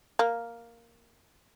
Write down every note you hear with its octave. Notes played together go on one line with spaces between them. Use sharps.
A#3